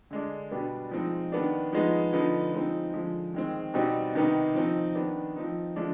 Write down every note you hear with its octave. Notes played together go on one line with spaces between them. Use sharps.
D3 G#3 D4
B2 G3 B3 D4
F3 G#3 C4 D#4
D#3 B3 D4
F3 G#3 B3 D#4
D3 F3 B3 D#4
F3 G#3 C4 D#4
D3 F3 G#3
D#3 G#3 C4
B2 G3 C4 D#4
C3 D#3 B3 D#4
F3 C4 D#4
D#3 B3 D4
F3 C4 D#4
D3 F3 G#3 D4